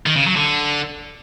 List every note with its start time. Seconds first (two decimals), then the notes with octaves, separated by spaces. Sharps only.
0.06 D#3
0.16 C#3
0.26 F#3
0.36 D3